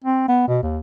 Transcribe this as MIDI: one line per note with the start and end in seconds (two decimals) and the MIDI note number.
0.04 0.24 60
0.28 0.47 59
0.47 0.60 47
0.63 0.79 39